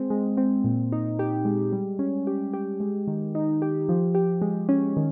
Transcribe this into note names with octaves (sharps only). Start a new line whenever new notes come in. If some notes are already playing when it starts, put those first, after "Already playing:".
Already playing: G#3 C4
G#3
C4
A#2
D#4
G4
G#3
G3
C#4
G4
G4
G#3
D#3
D#4
G4
F3
G4
G#3
C#4
D#3